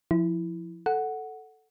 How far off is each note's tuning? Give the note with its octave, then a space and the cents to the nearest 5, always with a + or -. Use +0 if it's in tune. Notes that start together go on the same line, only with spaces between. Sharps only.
F3 +0 E4 +0
A4 +0 F#5 +0